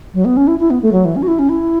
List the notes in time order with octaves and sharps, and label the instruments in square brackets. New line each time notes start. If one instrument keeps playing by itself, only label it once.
[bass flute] F#3
B3
C#4
E4
E4
B3
A3
F#3
E3
C#4
F#4
E4
C#4
E4